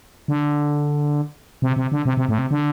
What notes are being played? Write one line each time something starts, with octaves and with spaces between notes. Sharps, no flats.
D3
C3
C3
D3
C3
C3
A2
C3
D3